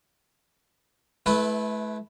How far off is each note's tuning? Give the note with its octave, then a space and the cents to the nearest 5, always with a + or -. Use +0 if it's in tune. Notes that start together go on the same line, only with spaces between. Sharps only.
A3 -30 E4 +0 B4 +0